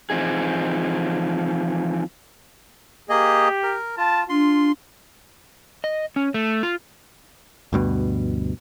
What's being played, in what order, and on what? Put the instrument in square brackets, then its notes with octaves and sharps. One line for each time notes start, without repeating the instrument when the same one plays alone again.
[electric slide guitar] E3 F3 C4 D#4 G#4
[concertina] A#3 G#4 D#5 [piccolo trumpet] G4
[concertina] A#4
[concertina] F4 [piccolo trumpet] A5
[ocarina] D4 [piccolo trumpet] F4 [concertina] C6
[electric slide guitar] D#5
C#4
A3
F4
[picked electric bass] D2 G2 B2